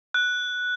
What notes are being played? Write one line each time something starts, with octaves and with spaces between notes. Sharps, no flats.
F#6